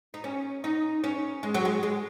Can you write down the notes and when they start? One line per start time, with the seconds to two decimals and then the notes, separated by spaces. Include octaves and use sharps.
0.14 D#4
0.24 C#4
0.64 D#4
1.04 C#4
1.43 G#3
1.54 F#3
1.65 G#3
1.83 G#3